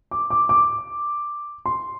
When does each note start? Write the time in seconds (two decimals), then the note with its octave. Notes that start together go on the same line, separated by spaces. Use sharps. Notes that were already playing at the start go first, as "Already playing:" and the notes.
0.11 D6
0.30 D6
0.49 D6
1.66 C6